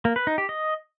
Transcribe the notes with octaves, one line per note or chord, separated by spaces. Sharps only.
A#3
B4
D#4
G4
D#5